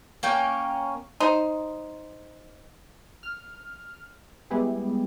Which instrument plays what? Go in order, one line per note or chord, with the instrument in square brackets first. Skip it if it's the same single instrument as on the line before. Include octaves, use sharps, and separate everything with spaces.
[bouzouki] A#3 C#4 G5
[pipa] D#4 C5
[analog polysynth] F6
G3 G#3 B3 E4 G4 G#4